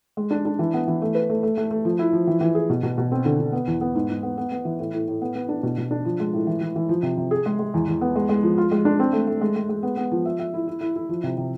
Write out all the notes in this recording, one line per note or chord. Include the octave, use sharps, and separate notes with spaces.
G#3
D4
D4
E3
B3
E3
A3
B4
A3
A3
A3
A3
F3
E4
F3
E3
E3
G#4
B2
B2
B2
C4
D3
D3
B3
E2
B3
G#2
G#2
B3
B3
B3
E3
A2
A2
A2
B3
B3
D4
B2
B2
D4
F3
G#3
A2
E3
E3
E3
F3
C3
C3
G#4
G#3
G#3
E2
E2
B3
G#3
G#3
F3
F4
G#3
D4
C4
A3
A3
G#3
G#3
G#3
B3
B3
F3
E5
E5
E4
E4
E4
E4
F3
C3
C3